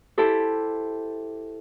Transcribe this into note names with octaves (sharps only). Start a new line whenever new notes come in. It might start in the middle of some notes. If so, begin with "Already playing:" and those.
E4 G4 A4 C5